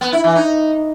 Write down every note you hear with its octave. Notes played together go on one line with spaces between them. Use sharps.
B3
E4
E3
D#4